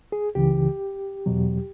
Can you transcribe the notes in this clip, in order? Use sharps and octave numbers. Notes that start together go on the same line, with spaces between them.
G#4
C#2 C#3 E3 G4
E2 B2 F#3